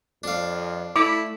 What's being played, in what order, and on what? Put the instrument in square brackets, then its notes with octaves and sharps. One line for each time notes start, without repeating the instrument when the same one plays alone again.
[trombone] F2 [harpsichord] D4 F5
[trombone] A3 [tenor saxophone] E4 [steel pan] D6